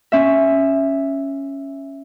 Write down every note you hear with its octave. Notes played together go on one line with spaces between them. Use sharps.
C#4 E5